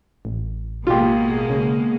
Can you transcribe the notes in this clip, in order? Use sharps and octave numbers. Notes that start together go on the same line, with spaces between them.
A1
B2 G#3 A#3 F4 G4
C#3